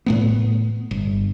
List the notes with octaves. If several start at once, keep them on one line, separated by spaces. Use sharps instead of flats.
A2 A3 B3
G1